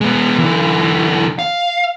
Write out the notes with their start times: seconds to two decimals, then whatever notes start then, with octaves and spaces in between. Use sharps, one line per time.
0.01 G#3 B3
0.39 D3 E3
1.39 F5